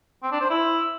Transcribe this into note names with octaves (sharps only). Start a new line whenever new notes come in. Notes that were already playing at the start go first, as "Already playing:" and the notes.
C4
D4
C5
E4